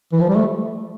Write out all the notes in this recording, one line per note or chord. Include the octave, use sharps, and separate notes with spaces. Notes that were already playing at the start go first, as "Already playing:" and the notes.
E3
F3
G3
A3